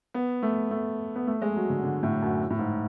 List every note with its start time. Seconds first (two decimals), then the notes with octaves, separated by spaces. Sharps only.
0.14 B3
0.42 A3
0.71 A3
1.16 B3
1.27 A3
1.42 G#3
1.56 F#3
1.70 D3
1.83 D3
2.03 A2
2.22 F#2
2.50 A2
2.59 G#2